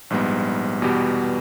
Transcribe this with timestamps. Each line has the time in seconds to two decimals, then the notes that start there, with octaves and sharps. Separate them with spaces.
0.10 A#1 G#2 G3 B3
0.82 E2 B2 G3 B3 G4